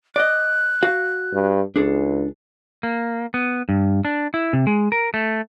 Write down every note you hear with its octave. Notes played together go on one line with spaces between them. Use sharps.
D5 D#5 F#6
F#4 F5
G2
C#2 D4 G#4 A4
A#3
B3
G2
D4
E4
C3
G#3
A#4
A3